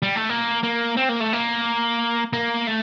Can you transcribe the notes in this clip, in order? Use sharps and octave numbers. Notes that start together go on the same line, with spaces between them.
G3
A3
A#3
A#3
C4
A#3
A3
A#3
A#3
A3